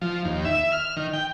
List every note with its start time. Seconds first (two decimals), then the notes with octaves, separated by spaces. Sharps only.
0.01 F3
0.25 D#2
0.45 E5
0.72 F6
0.97 D#3
1.13 G5